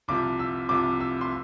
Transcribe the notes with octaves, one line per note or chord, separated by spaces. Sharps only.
C2 C3 F3 D6
E6
C2 C3 F3 D6
E6
C6